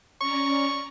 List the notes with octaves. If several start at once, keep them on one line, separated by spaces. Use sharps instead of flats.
C#4 D5 A#5 C#6